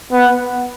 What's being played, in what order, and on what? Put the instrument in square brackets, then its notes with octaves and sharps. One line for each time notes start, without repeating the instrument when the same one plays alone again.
[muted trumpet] B3